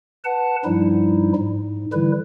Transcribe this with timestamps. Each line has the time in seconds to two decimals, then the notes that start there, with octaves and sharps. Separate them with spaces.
0.25 B4 F#5 A5
0.65 G2 F3 G3 D#4 E4
1.36 G#2
1.93 D3 E3 G3 E4 B4